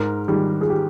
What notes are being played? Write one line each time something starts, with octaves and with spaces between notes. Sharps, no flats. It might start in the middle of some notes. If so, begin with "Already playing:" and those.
Already playing: G#2 A#4
D#3 G3 G#4
G#4
G4